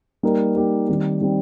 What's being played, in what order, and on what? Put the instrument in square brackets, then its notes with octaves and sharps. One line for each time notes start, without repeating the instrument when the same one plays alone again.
[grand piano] G3 A#3 D#4 G4 A#4
G3 A#3 D#4 G4 A#4
D#3 G3 C4 G4
D#3 G3 C4 G4